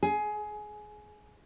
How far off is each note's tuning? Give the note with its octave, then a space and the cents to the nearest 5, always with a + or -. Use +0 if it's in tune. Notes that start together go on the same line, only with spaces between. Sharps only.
G#4 +20